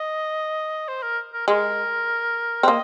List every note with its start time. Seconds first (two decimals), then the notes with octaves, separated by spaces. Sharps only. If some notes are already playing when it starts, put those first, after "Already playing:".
Already playing: D#5
0.88 C5
1.03 A#4
1.33 A#4
1.48 G#3 A#4
2.63 C4
2.68 A#3 D#5